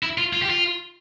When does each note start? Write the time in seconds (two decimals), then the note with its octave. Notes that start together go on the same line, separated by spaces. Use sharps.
0.03 E4
0.18 F4
0.33 F4
0.42 G4
0.50 F4